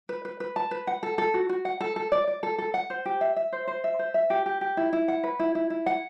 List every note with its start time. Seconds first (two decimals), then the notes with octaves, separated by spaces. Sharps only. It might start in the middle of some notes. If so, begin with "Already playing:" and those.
0.09 B4
0.25 B4
0.40 B4
0.56 A5
0.71 B4
0.87 F#5
1.03 A4
1.18 A4
1.34 F#4
1.49 F#4
1.65 F#5
1.81 A4
1.96 A4
2.12 D5
2.27 D5
2.43 A4
2.58 A4
2.74 F#5
2.90 C5
3.06 G4
3.21 E5
3.36 E5
3.52 C5
3.67 C5
3.84 E5
3.99 C5
4.14 E5
4.30 G4
4.46 G4
4.61 G4
4.77 E4
4.93 E4
5.08 F#5
5.23 B4
5.39 E4
5.55 E4
5.70 E4
5.86 F#5